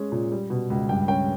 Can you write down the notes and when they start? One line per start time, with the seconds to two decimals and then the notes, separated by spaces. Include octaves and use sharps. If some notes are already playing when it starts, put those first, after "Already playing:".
Already playing: G#3 C#4
0.12 A#2
0.32 G3
0.50 B2
0.70 C#2
0.89 G2 G5
1.08 C#4 G5